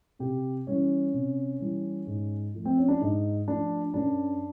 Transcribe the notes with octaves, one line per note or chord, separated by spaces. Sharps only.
C3 G4
E3 G3 C#4
C3
E3 G3
G#2
F3 A3
C4
C#4
D4
G#2 D#4
F3 A3 D4
F#2 D4